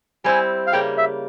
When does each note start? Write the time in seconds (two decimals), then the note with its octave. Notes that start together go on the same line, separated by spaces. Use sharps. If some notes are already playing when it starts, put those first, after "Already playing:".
0.24 G3 C4 E4 G#5
0.67 F5
0.73 C#3 G3 A#3 G5
0.98 E5